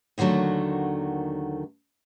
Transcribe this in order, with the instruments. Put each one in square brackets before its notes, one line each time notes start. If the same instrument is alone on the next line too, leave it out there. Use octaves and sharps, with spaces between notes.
[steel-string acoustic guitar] D#2 D3 D#3 F#3 A3